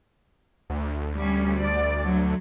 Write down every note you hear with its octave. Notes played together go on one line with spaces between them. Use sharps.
D2
G3 C#4
D5
F#3